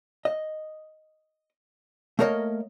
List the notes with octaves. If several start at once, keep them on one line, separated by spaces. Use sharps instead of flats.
D#5
A3 A#3 A#4 C#5 D#5